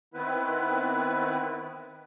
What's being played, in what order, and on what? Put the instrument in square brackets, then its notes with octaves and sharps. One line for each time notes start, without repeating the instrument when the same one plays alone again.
[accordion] D#3 B3 C4 E4 B4